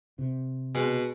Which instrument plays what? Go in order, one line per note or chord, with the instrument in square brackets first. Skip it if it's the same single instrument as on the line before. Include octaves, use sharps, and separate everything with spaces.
[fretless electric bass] C3
[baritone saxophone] B2 [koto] G#3